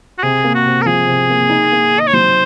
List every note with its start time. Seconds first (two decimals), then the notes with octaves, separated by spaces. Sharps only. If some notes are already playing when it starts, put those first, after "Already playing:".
0.18 F#4
0.23 C3 G#4
0.44 A#3
0.55 F#4
0.66 C3
0.82 A#4
0.86 F3 G#4
1.07 C3
1.30 A#3
1.50 D#4
1.72 A#3
1.92 D#3
2.00 D#5
2.07 C#5
2.13 F#3 C5